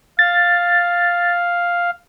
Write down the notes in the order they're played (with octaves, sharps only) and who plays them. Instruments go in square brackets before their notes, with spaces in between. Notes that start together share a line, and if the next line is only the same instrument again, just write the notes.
[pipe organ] F5 [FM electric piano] A6